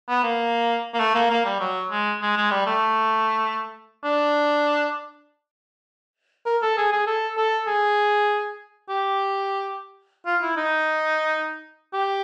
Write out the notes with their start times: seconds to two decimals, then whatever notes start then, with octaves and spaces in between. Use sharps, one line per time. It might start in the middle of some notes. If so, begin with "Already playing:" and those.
0.09 B3
0.23 A#3
0.94 A#3
0.99 A3
1.15 A#3
1.30 A#3
1.45 G3
1.60 F#3
1.91 G#3
2.22 G#3
2.37 G#3
2.51 G3
2.66 A3
4.04 D4
6.46 A#4
6.62 A4
6.77 G#4
6.92 G#4
7.07 A4
7.37 A4
7.67 G#4
8.89 G4
10.26 F4
10.42 E4
10.57 D#4
11.93 G4